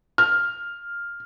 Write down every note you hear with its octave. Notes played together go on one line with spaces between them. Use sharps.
F6